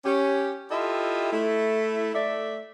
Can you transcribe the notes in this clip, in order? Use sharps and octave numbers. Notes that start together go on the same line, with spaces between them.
C#4 G4
E4 F4 G4 A4 D#5 E5
A3 E4
A3 D5 E5